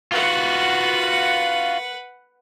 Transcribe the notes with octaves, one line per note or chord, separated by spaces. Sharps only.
F4 F#4 B4 F#5